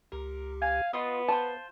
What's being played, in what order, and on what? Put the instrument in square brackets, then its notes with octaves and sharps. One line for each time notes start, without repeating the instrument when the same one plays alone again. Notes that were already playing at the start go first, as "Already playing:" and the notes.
[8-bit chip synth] C#2 G4 [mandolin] A#4
[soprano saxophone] F5 [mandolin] G#5
[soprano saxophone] B3 [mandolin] F4 D#5 [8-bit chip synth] B4
[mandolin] F4 C5 [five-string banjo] A5